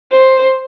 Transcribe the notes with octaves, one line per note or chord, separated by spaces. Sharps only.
C5